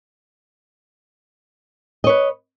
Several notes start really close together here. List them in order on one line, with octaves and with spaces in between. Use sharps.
D#5 C#5 B4